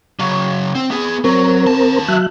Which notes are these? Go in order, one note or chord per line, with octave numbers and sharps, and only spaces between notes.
C#3 F#3
C4
B3 G#4
F#3 C4 A#4
D#2 A5
F#3 E5 F#6